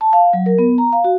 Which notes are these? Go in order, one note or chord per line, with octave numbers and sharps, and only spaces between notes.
A5
F5
F#3
A#4
B3
A#5
F5
F#4